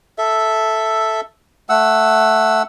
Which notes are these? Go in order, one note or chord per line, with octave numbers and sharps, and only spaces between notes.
A4 E5
A3 F#5 E6